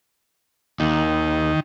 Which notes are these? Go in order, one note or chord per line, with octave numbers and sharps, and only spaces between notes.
D#2 D#3